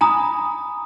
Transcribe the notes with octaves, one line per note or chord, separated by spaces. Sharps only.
G#5 A#5 B5 D#6